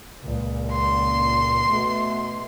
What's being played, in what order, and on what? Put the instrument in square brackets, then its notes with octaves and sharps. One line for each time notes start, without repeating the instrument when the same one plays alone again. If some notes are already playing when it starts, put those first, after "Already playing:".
[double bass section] C#2 A#2
[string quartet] C6
[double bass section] B2 A3